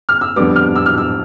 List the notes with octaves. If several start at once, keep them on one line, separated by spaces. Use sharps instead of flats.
F6
E6
F2 D3 G3 B3 D6
F6
E6
F6
E6